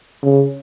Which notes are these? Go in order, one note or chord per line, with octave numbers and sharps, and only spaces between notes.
C#3